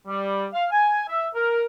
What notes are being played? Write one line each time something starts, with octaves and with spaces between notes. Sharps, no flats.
G3
F5
G#5
E5
A#4